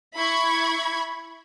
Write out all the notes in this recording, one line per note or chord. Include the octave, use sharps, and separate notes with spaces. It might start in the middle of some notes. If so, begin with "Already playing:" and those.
E4 B5 C#6 G#6